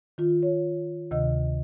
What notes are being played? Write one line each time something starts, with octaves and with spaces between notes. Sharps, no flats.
D#3 F4
C#5
D2 C3 D#3 D#5